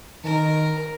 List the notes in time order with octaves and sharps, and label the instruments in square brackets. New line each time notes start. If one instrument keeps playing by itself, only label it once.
[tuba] D#3 [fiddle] A#4